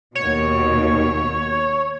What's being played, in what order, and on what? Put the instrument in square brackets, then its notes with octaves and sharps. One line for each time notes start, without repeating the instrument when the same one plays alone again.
[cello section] D#2 B2 [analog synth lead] C#5